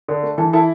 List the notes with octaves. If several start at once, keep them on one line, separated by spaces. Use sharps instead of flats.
D3
A3
E3 A4
E4 A4